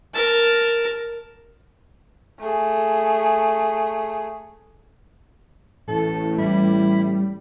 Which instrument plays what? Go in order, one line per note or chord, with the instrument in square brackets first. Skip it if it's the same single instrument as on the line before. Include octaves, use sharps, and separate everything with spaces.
[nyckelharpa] A#4 A5
[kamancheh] A3 G#4
[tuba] A1 [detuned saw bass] A2 [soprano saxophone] A4
[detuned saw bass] G3 [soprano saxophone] E4